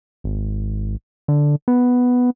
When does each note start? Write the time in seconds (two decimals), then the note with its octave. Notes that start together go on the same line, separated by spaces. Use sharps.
0.24 G#1
1.28 D3
1.68 B3